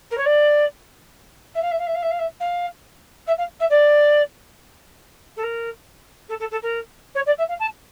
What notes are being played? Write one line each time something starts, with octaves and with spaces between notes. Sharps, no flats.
A#4
C#5
D5
E5
F5
E5
F5
E5
F5
E5
F5
E5
F5
E5
F5
E5
D5
A4
A#4
A4
A4
A4
A#4
C#5
D5
E5
F5
A5